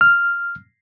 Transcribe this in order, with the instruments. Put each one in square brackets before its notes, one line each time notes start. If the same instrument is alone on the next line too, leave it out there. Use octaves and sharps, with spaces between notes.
[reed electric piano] F6